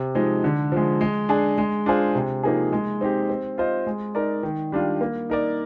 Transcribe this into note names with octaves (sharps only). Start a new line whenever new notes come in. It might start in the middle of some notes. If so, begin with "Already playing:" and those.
Already playing: C3
F3 G#3 D#4
D3
F3 G#3
G#3
D4 G#4
G#3
D4 F4 G#4 C5
C3
F3 A#3 D#4 G#4
G#3
C4 D#4 G4
C4
F4 C5 D#5
G#3
D#4 A#4 D5
D#3
G3 D4 F4
A#3
D#4 A#4 D5